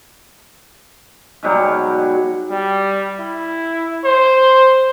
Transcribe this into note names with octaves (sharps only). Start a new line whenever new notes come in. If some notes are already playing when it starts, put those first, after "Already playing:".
G#2 B2 F#3 G3
G3
E4
C5